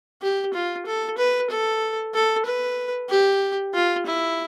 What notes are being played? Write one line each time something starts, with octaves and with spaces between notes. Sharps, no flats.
G4
F4
A4
B4
A4
A4
B4
G4
F4
E4